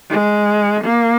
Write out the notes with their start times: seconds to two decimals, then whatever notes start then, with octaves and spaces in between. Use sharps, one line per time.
0.10 G#3
0.84 A#3